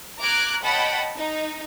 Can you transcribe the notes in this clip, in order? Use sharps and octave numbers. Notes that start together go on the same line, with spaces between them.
A#5 D6 F6 F#6 G#6
C#5 D#5 F#5 G5 A5 B5
D#4